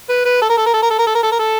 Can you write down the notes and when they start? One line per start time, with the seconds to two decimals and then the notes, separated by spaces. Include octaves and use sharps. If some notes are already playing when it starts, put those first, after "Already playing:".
0.09 B4
0.25 B4
0.42 A4
0.49 A#4
0.58 A4
0.66 A#4
0.74 A4
0.83 A#4
0.90 A4
0.99 A#4
1.07 A4
1.15 A#4
1.23 A4
1.32 A#4
1.39 A4